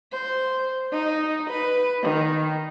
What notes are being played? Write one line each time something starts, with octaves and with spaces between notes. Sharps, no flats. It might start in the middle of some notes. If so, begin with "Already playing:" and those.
C5
D#4
B4
D#3